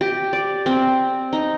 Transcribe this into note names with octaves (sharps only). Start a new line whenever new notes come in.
G4
D5
C4
D#4